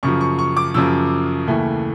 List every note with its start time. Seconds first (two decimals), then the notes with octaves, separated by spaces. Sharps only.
0.03 F#2 C#3 F3 C#6
0.21 C#6
0.39 C#6
0.57 D6
0.74 F#2 C#3 F3 E6
1.47 D#2 C#3 E3 A3